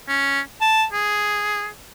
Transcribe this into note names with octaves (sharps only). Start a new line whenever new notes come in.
C#4
A5
G#4